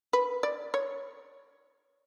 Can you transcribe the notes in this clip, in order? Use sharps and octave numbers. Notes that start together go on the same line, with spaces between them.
B4
D5
C#5